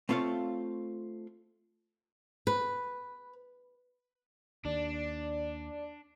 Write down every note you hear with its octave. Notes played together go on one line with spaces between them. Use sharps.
A3 C4 F4 C#5 F5
B4
D#2 D4 D5